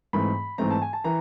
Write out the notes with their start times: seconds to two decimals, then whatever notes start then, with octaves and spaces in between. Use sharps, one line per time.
0.13 G#2 E3 A3 C4 B5
0.58 G#2 E3 A3 C4 A#5
0.71 A5
0.82 G#5
0.93 A5
1.04 E3 A#5